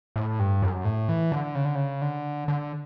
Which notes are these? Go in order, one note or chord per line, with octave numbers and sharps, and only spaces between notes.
A2
G2
F#2
A2
E3
D3
C#3
D3
C#3
D3
D3